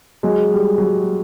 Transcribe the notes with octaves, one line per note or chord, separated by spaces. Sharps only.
F#3 G#3
G3
F#3
G3